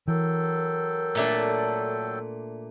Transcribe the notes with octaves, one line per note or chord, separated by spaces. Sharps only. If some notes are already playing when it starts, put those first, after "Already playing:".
E3 F#3 A4 A#4 G5
A#2 A3 D4